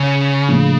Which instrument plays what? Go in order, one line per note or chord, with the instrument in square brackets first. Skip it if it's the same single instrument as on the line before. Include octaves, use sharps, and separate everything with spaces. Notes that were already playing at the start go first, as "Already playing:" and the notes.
Already playing: [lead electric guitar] C#3
[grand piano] A2 F3 A#3 D4